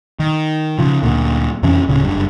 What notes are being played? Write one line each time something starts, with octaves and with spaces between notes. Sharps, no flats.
D#3
C#3 F3
D2 A#2
F2 C3 E3 C#4
D1 C#3 B3 C#4
F#1 G2